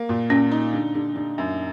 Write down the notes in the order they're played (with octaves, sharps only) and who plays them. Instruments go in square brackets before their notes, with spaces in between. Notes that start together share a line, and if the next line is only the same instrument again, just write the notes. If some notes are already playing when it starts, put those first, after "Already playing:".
Already playing: [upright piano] A#3
A#2
[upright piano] A#2 [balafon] C#4
[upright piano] D#4
D3
D3
D3
F#2